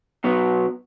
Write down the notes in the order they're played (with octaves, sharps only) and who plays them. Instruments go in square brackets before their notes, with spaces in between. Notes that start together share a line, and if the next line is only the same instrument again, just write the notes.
[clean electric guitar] B2 F#3 B3